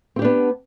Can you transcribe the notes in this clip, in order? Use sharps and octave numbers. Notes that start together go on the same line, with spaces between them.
B3 C4 D4 G4